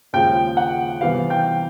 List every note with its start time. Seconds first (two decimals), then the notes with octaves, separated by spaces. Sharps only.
0.13 D#2 C#3 F3 G#3 G5
0.57 F#5
1.01 C3 E3 G3 B3 F5
1.30 G5